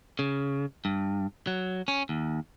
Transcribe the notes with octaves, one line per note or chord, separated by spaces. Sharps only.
C#3
G2
F#3
C#4
D#2